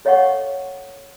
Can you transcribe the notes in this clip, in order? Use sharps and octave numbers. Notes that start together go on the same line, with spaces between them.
A4 C#5 D#5 F5 F#5 C#6